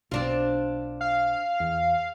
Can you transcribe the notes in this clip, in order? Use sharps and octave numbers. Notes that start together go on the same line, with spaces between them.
B1 C4 D4 F4
F5
E2